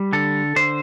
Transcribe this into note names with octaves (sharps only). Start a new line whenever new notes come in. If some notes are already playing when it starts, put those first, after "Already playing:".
Already playing: G3
D3 A4
D3 C5